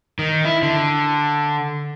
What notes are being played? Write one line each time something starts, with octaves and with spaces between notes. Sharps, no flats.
D#3
E4
D3